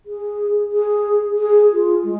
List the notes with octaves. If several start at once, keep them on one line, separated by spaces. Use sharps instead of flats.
G#4
G#4
G#4
F4
G#3